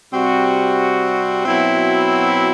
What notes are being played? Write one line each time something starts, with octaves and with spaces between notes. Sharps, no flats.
C3 G3 C4 F#4
B2 F#3 C4 E4